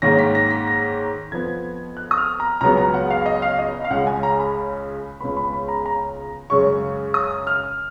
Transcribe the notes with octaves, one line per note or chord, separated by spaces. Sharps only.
G#2 D#3 A#3 C#4 A#6
B6
A#6
B6
A#6
F2 F3 B3 G#6
F#6
D#6
F6
A#5
C#2 C#3 F#3 B3 A#5
A#5
F#5
F5
D#5
F5
D#5
F5
C#2 C#3 G#3 F#5
G#5
A#5
B5
C#2 C#3 G#3 B3 B5
B5
B5
A#5
A#5
F#2 C#3 G#3 C#4 C#6
D#6
F6